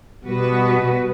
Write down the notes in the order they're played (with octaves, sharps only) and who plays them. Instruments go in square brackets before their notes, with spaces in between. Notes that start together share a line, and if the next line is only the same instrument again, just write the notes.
[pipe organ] B2 B3 [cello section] G3 F#4 B4